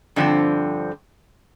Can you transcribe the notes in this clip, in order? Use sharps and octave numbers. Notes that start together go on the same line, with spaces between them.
G2 D3 F3 C4